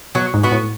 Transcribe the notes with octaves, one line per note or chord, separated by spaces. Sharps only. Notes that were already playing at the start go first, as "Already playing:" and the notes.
B2 F#3
G#2
B3 F#4
A2